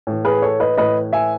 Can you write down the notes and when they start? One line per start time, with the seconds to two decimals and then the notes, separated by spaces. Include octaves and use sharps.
0.07 A2 E3
0.25 G#4 B4
0.42 A4 C#5
0.60 B4 D#5
0.77 A2 E3 B4 D#5
1.13 E5 G#5